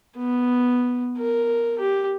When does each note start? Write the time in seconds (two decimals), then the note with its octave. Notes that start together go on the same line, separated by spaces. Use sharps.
0.16 B3
1.18 A#4
1.79 G4